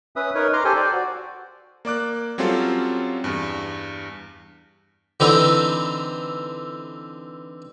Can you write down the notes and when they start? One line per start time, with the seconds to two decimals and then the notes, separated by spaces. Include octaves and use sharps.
0.16 C#4 B4 E5 D#6
0.35 D#4 A#4 B4 C#5
0.53 A#5 C6 D6 F6
0.65 G4 A4 C5 G#5
0.76 C5 D5
0.93 F#4
1.85 A#3 D5 D6 F#6
2.38 F#3 G3 C4 C#4 F4 A4
3.24 E2 G2
5.20 D3 E3 C4 D#4 G4 A4